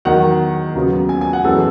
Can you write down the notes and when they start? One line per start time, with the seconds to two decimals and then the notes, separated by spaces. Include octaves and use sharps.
0.05 E2 D#3 F#3 F#5
0.75 D#2 C#3 F#3 B3
1.09 G#5
1.21 G#5
1.33 F#5
1.44 F#2 E3 G#3 B3 A4